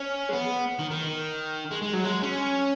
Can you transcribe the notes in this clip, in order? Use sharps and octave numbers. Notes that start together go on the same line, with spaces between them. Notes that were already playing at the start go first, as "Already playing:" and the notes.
Already playing: C#4
G#3
B3
D#3
D#3
G#3
G#3
F#3
G#3
C#4